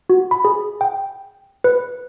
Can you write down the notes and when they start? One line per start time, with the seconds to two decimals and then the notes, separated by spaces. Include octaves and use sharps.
0.10 F#4
0.31 B5
0.45 G#4
0.81 G5
1.64 B4